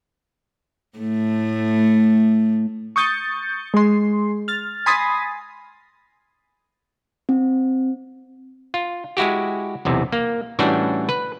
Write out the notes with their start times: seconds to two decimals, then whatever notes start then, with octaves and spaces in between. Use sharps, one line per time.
0.98 A2 A3
2.96 C#6 D#6 G6 A6 C#7
3.74 G#3 C6
4.48 F6 A6
4.86 G#5 B5 C6 D#6 A6 A#6
7.29 C4
8.74 F4
9.17 G#3 E4 F#4 G4
9.85 B1 E2 C3
10.12 A#3
10.59 A2 E3 G3 C#4 D4 F#4
11.09 B4